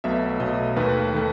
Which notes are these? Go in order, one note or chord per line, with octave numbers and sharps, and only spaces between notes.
B1 B2 F#3 A3 E5
B1 B2 F#3 A3 D#5
D#2 D#3 A3 B4
D#3 A3